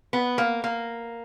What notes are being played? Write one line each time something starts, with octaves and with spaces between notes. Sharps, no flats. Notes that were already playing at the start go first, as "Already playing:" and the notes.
B3
A#3
A#3